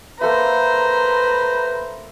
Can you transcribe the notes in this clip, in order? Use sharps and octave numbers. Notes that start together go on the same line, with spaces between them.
A#3 A4 B4 C5 E5 A#5